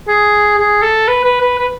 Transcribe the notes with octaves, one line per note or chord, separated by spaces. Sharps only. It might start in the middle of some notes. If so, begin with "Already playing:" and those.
G#4
G#4
A4
B4
B4
B4
B4